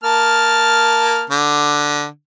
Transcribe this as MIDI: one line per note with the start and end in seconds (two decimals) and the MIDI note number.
0.04 1.23 58
0.04 1.23 81
0.04 1.23 89
1.30 2.06 50